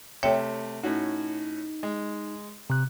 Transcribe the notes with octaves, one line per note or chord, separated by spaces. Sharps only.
C3 A3 C#5 E5 G5
A2 C#4 D#4 F#4
G#3
C3 F#6